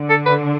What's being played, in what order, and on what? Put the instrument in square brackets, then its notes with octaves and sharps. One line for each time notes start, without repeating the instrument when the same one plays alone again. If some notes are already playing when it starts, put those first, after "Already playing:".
Already playing: [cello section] D3
[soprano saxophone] A4
B4